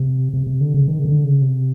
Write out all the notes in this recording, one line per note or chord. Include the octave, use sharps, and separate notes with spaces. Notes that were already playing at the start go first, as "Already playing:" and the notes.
Already playing: C3
C3
C3
D3
C#3
D#3
C#3
D3
C#3
C3